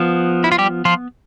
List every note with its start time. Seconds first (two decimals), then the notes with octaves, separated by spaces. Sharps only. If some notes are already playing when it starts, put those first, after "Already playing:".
Already playing: F3 B3
0.44 E4
0.52 F4
0.58 G3 G4
0.85 F3 F4